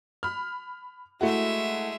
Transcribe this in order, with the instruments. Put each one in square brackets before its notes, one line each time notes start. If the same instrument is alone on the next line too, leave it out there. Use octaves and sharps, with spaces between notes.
[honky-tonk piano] B5 F6
[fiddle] G#3 E5 [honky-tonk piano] A3 E4 F#4